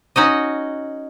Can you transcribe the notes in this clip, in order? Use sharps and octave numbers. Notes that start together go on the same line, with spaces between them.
C#4 D#4 F#4 D#5